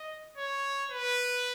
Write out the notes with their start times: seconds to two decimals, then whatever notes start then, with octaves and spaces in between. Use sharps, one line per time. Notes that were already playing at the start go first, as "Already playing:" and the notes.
Already playing: D#5
0.37 C#5
0.91 B4